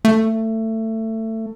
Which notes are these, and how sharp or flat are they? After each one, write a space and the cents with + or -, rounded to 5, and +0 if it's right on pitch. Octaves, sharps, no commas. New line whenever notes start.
A3 +20